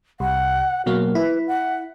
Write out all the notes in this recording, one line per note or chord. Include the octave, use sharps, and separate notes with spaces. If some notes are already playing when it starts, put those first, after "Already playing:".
C2 F#5
B2 F#3 A#3 F#4
E4 B4
F#5